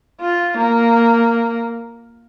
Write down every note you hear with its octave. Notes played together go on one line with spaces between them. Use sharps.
F4
A#3